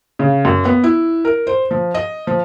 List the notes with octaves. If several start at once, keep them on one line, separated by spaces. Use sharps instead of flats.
C#3
F#2
B3
E4
A#4
C5
F3
D#5
F3